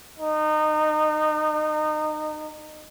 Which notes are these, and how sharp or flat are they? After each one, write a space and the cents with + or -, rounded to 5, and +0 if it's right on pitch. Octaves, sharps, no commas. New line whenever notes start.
D#4 -25